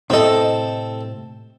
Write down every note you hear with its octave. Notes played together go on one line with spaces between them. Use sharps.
A2 C3 C4 E4 A4 D#5